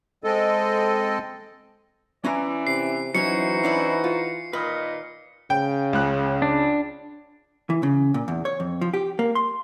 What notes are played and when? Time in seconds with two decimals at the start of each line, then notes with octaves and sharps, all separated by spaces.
0.24 G#3 C4 A4 D#5
2.24 E3 C#4 D5 G#5 A#5
2.67 C3 C7
3.15 E3 F#3 C#4 D#4 E4 F#4 C5 C#7
3.63 C#4 D4 E4
4.04 F4
4.53 A#2 D#3 B4 D#5
5.50 C#3 G5
5.93 C#2 F#6
6.42 D4
7.70 E3
7.83 C#3
8.14 A#2
8.28 E2
8.45 C#5
8.60 F2
8.81 F3
8.94 G4
9.19 A#3
9.35 C6